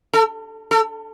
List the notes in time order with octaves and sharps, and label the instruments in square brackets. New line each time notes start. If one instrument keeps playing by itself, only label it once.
[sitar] A4
A4